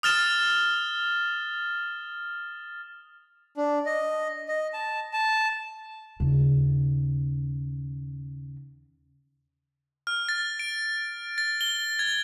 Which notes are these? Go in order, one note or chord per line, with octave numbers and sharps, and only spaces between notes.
D#6 F6 A6 E7
D4
D#5
D#5
A5
A5
D#2 C#3
F6
A6
D7
A6
G7
G#6